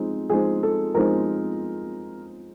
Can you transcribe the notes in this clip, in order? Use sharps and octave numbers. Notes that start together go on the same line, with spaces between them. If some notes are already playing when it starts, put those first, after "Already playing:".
Already playing: F3 G#3 C4 D#4
F3 G#3 C4 D#4 G#4
A4
F3 G#3 C4 D#4 A#4